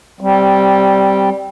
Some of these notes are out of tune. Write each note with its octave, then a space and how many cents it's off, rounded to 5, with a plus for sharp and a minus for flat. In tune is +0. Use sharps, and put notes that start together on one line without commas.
G3 -5 C4 +0